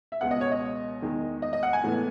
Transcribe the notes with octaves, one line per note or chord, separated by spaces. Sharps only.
E5
C#2 B2 G#3 B3 F#5
D#5
C#5
D#5
E2 D#3 G#3
D#5
D#5
F#5
G#5
A2 E3 G#3 B3